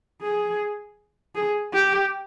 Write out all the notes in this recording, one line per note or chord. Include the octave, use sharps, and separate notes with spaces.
G#4
G#4
G4